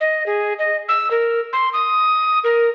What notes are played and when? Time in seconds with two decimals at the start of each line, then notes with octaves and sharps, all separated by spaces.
0.01 D#5
0.26 G#4
0.59 D#5
0.89 E6
1.11 A#4
1.53 C6
1.73 D#6
2.44 A#4